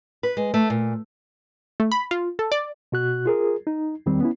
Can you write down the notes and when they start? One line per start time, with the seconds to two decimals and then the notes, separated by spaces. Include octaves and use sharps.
0.23 B4
0.37 G#3
0.54 A3
0.70 A#2
1.80 A3
1.92 B5
2.11 F4
2.39 A4
2.52 D5
2.92 B2 F#4 F#6
3.26 F4 G#4 A#4
3.67 D#4
4.06 E2 D#3 G3 C4
4.20 B3 C#4 E4